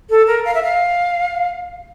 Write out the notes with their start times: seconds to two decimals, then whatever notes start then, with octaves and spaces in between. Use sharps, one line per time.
0.10 A4
0.27 A#4
0.45 F5
0.55 E5
0.63 F5